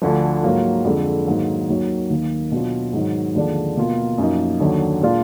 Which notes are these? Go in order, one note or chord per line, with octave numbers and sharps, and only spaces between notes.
D2 D3 F3
G#2 F#3 A#3 F4
F2 D3 G#3
G#2 D#3 F#3 A#3
D#2 D#3 F#3
D#2 D#3 A#3
B2 F#3 D4 F4
G#2 D#3 F#3
D#2 D3 F3 G#3 D4
B2 A#3 F4
F#2 F3 A#3 D#4
D#2 D3 F#3
A#2 G#3 D4 F4